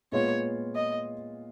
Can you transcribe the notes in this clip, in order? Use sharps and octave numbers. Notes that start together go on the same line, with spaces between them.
A#2 G#3 B3 F4 C#5
D#5